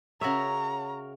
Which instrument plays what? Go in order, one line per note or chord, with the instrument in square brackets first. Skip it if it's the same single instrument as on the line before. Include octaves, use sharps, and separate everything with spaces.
[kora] C#3 E5 [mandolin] F#4 A#4 C#5 [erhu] A#5